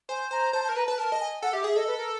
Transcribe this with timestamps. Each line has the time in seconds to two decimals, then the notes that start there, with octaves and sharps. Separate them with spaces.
0.09 C5 G#5
0.31 C5 A#5
0.53 C5 A5
0.64 A#4 A5
0.76 B4 A#5
0.87 B4 A5
0.98 A#4 A5
1.12 D#5
1.20 G#5
1.42 A4 F#5
1.53 G4 E5
1.64 G#4 E5
1.76 A4 D#5
1.87 B4
1.97 A#4